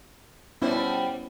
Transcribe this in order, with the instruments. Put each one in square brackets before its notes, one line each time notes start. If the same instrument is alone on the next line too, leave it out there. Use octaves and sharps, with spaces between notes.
[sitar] B2 G3 C5 [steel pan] B3 C#4 E4